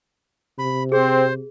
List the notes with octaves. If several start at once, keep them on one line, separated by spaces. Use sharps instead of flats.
C3 B5
C4 G#4 C5